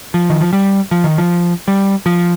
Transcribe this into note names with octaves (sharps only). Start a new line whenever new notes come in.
F3
D#3
F3
G3
F3
D#3
F3
G3
F3